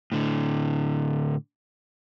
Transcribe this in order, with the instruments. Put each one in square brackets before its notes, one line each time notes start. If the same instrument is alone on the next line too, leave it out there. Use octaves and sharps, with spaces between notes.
[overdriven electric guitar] A2 D3